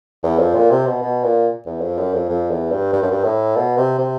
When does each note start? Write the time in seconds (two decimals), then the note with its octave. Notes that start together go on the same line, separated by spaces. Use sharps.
0.23 E2
0.39 F2
0.55 A#2
0.71 C3
0.87 B2
1.02 B2
1.24 A#2
1.66 E2
1.81 F2
1.98 F#2
2.14 F2
2.29 F2
2.51 E2
2.72 G2
2.93 G2
3.02 F#2
3.11 G2
3.24 A2
3.56 B2
3.78 C3
3.98 C3